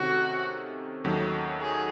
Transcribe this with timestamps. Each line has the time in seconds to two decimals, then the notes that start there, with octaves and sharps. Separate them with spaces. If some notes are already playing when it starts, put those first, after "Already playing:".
Already playing: C3 D#3 A3 C#4 F#4
1.04 D#2 D#3 F#3 A3 C#4
1.61 G#4